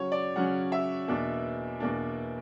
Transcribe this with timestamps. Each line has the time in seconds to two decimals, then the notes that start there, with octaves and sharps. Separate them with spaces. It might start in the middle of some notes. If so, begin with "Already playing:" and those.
Already playing: C#3 F#3 C#4 C#5
0.12 D5
0.36 C#3 F#3 C#4 F#5
0.72 E5
1.08 E2 B2 A#3 D4
1.80 E2 B2 A#3 D4